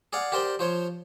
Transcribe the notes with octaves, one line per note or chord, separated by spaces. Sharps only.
G#4 D5 F5 F#5
G4 A#4 C5 D5 G5
F3 C5 C#5